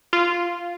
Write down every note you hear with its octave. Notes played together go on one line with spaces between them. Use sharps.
F4